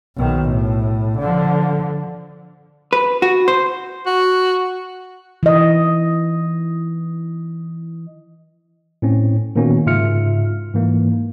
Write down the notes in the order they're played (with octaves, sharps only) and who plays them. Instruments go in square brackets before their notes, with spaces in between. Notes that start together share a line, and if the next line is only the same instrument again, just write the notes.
[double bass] B1 D#3
A2
D3 F3
[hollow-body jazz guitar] B4
F#4
C5
[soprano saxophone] F#4
[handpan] E3 D#5
[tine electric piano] A2 C4 C#4
A#2 D#3 A#3 B3 C#4 F#4
G#2 C#3 F4 E5 F6 C#7
G#2 E3 A#3